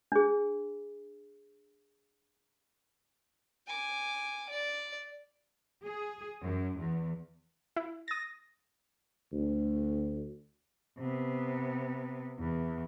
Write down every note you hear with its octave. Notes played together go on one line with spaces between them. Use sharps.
D4 G#4
G#5 D6
D5
G#4
F#2
E2
E4
D#6 A6 A#6
D2
C3 B3
E2